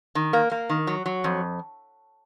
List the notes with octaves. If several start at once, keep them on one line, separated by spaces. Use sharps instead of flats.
D#3
A#3
A#3
D#3
F#3
F#3
F2